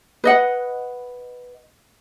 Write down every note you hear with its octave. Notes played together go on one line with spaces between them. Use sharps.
B4 D#5 F#5